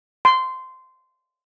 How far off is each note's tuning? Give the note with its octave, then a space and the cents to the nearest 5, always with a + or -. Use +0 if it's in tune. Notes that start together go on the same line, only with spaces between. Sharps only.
C6 -15